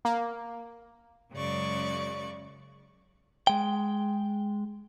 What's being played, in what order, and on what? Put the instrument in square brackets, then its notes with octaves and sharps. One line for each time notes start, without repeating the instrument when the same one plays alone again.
[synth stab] A#3
[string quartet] F#2 C#3 G#3 D5 C#6
[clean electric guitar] G#3 G5